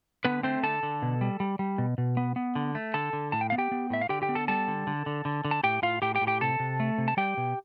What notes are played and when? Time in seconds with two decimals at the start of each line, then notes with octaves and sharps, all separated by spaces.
0.25 D3 B3 B4
0.43 A3 C4 C5
0.63 D3 A4 A5
0.83 D3
1.02 B2
1.21 G3
1.40 G3
1.59 G3
1.78 B2
1.98 B2
2.17 B3
2.36 B3
2.55 D3
2.75 A3
2.94 D3 A4 A5
3.13 D3
3.32 A2 A5
3.41 G5
3.50 B3 F5
3.58 G4 G5
3.72 B3
3.90 A2 E5
4.01 F5
4.09 D3 G4 G5
4.22 G4 G5
4.29 B3
4.35 A4 A5
4.48 G3 A4 A5
4.68 D3
4.87 D3
5.06 D3
5.25 D3
5.45 D3
5.51 A5
5.64 A2 G4 G5
5.82 A2 F4 F5
6.02 A2 G4 G5
6.15 G4 G5
6.21 A2
6.27 G4 G5
6.41 C3 A4 A5
6.60 C3
6.80 A3
6.98 C3
7.08 A5
7.17 G3 G4 G5
7.37 B2